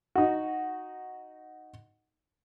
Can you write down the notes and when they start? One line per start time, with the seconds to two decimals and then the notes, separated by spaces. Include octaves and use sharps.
0.15 D#4 F#4